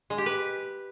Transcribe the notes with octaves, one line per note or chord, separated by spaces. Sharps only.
G#3
G4
B4